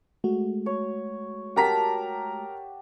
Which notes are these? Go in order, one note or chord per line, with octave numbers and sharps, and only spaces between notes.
G#3 A3 F#4
C#5
G4 A#4 F#5 A5 A#5 B6